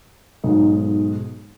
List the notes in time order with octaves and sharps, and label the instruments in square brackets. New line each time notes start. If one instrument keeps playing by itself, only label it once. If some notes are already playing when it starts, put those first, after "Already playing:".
[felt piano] B1 G#2